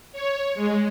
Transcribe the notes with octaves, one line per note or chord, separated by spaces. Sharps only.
C#5
G#3